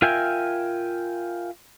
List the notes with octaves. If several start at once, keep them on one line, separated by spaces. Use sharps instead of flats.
F4 A#4 E5 G5 G#5